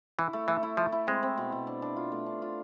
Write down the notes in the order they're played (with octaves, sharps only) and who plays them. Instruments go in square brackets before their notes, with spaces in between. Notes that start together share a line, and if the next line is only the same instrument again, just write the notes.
[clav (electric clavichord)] E3 [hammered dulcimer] E4
[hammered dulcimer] A3
[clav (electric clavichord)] E3 [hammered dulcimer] A3
[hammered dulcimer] E4
[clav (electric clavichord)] F3 [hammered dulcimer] A3
[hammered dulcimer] E4
[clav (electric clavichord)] G#3 [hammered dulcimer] C4
[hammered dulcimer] C4
B2
B2
D4
D4
F4
A3
D4
F4